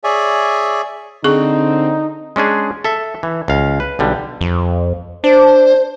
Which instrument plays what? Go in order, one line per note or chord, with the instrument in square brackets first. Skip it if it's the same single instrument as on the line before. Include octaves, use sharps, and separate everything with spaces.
[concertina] G#4 C#5 D5 E5 G#5
[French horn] D3 [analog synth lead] C4 [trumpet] D#4 [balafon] G#4 C#6
[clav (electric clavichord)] G#3 C#4 D4 G#4
A4 E5
E3
C#2 F5
B4
B1 D3 G3
[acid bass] F2
[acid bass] D4 [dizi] C5